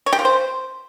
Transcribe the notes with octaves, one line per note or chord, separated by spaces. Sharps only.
C#5
G4
F4
C5